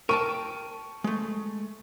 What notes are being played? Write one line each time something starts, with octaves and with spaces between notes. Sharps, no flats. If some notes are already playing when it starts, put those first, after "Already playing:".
A#4 G5 A5 C#6 D#7
G#3 A3